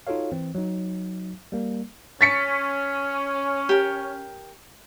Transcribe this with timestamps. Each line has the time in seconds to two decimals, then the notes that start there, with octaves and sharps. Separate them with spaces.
0.07 D#4 F4 F#4 A4 C#5 F5
0.32 E3 C4
0.55 F#3 D#4
1.52 G3 A#3
2.21 C#4 A6 B6 C#7
3.69 G4 A#4